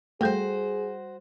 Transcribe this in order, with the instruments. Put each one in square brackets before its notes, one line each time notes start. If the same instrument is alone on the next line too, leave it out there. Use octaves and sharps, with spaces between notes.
[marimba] G3 A4 G5 [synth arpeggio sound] A3 [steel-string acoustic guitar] F#4 C5 [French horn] G#4